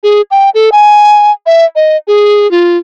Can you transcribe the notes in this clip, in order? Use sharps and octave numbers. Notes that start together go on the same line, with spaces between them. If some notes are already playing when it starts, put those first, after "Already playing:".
G#4
G5
A4
G#5
E5
D#5
G#4
F4